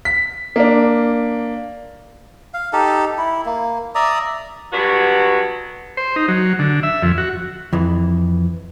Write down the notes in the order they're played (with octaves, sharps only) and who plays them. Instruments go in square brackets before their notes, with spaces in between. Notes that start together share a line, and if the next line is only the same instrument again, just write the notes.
[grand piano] B6
A#3 D4
[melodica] F5
D#4 G4 A4
E4
A#3
D5 E5 A#5 D#6
[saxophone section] D3 F#3 G3 B3 F#4 B4
[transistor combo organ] C5
D#4
F#3
D3
E5
F2
F#4
[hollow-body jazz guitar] F2 E3